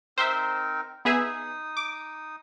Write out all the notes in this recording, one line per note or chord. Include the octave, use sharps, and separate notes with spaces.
C4 D#4 A#4 C5 E5
B3 D#4 G#4 E5 D#6
D6